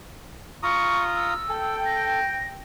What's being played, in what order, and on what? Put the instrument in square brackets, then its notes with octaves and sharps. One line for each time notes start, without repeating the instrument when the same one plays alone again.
[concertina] F4 A#5 D#6 [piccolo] C#6
[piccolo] E6
[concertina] A4 [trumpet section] G5
[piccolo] A#6